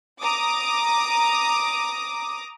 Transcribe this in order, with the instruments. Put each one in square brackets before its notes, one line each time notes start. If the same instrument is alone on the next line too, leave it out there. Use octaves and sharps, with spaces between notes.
[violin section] A#5 D6 D#6